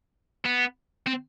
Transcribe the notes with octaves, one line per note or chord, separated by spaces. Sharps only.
B3
C4